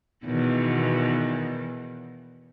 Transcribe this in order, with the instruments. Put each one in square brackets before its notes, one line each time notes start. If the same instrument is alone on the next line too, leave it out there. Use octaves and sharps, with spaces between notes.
[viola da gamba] E2 B2 D#3